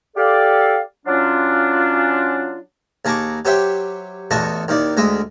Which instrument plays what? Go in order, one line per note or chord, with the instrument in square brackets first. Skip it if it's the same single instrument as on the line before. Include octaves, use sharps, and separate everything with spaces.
[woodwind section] G4 A4 D5 F5
F#3 C#4 D4 F4
[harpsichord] D#2 G#4 A5 A#5 C#6 D6
F#3 G4 C5 C#5 E5 G5
A1 E2 F#4 D#5 A5 C#6
D#2 D#3 E4 D5
D2 G#3 D#5 E5